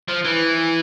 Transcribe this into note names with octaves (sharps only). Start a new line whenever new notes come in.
F3
E3